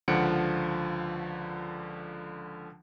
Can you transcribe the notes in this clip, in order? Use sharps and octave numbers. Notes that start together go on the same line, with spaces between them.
C#2 D3 F3 F#5 C#7 D7